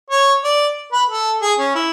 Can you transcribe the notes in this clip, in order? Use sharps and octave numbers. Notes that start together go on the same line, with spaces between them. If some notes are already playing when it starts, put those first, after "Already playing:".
C#5
D5
B4
A4
G#4
C#4
E4